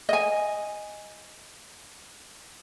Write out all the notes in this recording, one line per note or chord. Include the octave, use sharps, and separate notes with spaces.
D#5 G#5